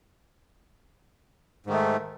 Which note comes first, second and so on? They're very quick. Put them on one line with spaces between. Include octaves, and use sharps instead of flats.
G#2 D#3 A3